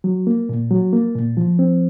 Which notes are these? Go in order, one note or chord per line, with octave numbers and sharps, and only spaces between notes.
F#3
A#3
A#2
F#3
A#3
A#2
F3
C4